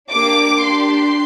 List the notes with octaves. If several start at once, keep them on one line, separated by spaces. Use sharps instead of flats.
A#3 D4 G4 D6
D4 G4 C6